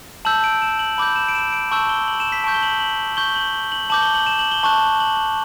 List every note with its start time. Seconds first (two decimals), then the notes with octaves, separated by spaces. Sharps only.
0.25 A5 E6 G6 F#7
0.44 D7
0.62 E7
0.79 F#7
0.98 B5 D6 G6 F#7
1.16 E7
1.29 D7
1.35 E7
1.53 D7
1.71 A5 C#6 E6 G6 F#7
1.89 G7
2.08 F#7
2.20 E7
2.32 B6
2.44 A5 C#6 G6 D7
2.54 G7
2.63 F#7
2.80 F#7
3.17 C#6 G6 G7
3.36 F#7
3.72 F#7
3.90 A5 D6 G6 F#7
4.02 G7
4.15 F#7
4.26 E7
4.39 F#7
4.52 G7
4.63 A5 C#6 F#6
5.00 F#7